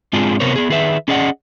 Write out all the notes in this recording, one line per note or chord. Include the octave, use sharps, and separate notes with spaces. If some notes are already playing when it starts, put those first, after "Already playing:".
G#2 G#3 C4 D4 F4 G#4
C3 B3 A#4 C5 C#5
B3 G#4
D#3 G#4 B4 E5
C#4 G#4 D5 D#5 F#5